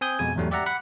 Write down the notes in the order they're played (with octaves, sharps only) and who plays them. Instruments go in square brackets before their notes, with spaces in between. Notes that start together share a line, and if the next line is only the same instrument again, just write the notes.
[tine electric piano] C4 G#5 D#6 G6
F2 B2 G#3 G#5
E2 G#2 F#3 G3 A3
G4 D5 E5 F#5 A#5
F#5 B5